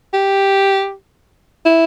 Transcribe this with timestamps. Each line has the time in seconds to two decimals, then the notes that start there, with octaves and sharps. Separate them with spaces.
0.14 G4
1.65 E4